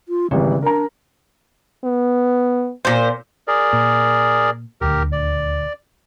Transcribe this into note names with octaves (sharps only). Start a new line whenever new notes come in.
F4
G#1 C#3 E3 G3
D4 A#4 A#5
B3
A#2 C5
G#4 A#4 D5
A#2
D#1 D2 G4 A#4
D5